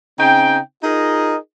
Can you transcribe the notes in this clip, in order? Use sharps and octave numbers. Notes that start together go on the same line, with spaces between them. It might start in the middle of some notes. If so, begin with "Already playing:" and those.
C#3 C4 D#4 G5
D#4 F4 G#4 A#4 D#5